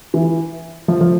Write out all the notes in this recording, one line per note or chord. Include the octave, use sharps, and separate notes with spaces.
E3
F3
F3